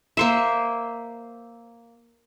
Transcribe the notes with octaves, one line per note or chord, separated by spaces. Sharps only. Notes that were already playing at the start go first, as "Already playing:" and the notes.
A#3 C5 E5